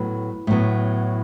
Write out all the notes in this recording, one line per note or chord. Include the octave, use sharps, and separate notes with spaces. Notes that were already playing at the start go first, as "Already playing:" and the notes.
Already playing: A2 F#3 B3 B4
A2 F#3 B3